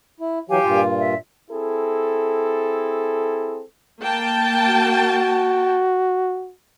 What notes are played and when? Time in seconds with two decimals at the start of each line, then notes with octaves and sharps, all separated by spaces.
0.20 E4
0.49 E3 F#3 G4 F5 G#5
0.64 G2 A#2 F4
0.98 E5
1.51 C4 E4 G#4 A4
4.01 A#3 G5 A5
4.68 F#4